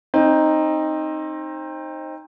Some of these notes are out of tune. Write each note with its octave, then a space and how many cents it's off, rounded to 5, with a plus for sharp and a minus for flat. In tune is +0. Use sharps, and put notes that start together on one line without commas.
C4 +25 D#4 +0